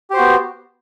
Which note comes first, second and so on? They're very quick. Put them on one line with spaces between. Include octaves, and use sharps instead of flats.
G4 C5 F#4 B3